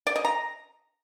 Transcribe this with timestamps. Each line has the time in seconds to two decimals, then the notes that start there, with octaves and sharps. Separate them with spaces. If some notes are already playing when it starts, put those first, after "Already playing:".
0.07 D5
0.16 D#5
0.25 A#5